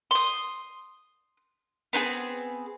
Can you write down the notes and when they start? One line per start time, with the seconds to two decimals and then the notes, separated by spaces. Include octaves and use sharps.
0.11 C6 D#6
1.93 B3 C4 E4 G#4